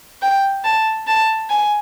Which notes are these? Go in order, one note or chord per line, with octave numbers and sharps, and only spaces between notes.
G5
A5
A5
G#5